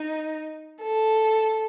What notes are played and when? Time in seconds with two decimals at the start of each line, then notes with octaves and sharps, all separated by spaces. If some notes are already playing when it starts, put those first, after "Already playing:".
Already playing: D#4
0.82 A4